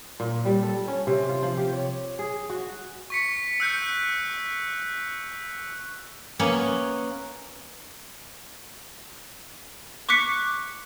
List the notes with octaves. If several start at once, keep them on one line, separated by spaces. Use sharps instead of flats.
A#2
G3
A4
C#4
C3
F4
F3
G4
C#5
G#4
F#4
C#6 B6 C#7
E6 F#6 G6 C#7
A#3 B3 C#4 C#5
C#6 D6 F#6 B6 C#7